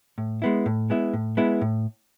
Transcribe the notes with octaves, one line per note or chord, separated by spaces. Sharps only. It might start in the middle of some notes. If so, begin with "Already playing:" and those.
A2
G#3 B3 E4
A2
G#3 B3 E4
A2
G#3 B3 E4
A2